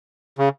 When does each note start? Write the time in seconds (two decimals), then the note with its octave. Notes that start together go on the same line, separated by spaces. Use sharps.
0.38 C#3